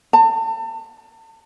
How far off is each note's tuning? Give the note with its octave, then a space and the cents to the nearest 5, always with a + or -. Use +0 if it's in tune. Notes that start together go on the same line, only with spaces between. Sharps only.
A5 +35